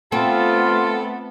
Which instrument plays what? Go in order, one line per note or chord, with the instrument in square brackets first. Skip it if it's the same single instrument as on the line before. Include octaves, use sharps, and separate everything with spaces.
[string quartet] A3 B3 [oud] C4 [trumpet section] F4 [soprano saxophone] A4